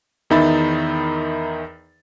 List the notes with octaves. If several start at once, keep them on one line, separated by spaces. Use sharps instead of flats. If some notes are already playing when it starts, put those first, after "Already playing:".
E2 D#3 D#4 E5 B5 A6